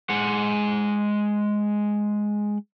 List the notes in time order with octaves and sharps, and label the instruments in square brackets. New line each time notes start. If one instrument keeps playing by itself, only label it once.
[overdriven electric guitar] G#3 F#5